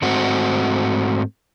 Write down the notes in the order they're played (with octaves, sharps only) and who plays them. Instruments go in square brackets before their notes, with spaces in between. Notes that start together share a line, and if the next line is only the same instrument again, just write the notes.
[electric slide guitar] G#2 A3 C4 F#4